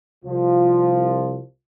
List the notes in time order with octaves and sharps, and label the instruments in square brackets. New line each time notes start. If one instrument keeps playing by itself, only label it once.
[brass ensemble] C2 F3